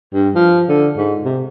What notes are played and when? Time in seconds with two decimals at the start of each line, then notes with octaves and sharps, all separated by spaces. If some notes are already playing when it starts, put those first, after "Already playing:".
0.14 G2
0.35 F3
0.69 D3
0.97 G#2
1.25 C3